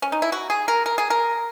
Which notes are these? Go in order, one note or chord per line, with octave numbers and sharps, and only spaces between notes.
C#4
D#4
E4
F#4
G#4
A#4
A#4
G#4
A#4